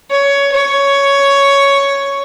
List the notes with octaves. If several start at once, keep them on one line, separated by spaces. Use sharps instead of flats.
C#5
C#5